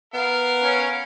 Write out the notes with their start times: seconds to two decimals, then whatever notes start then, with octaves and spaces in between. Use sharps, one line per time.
0.14 B3 A#4 F5
0.63 C#4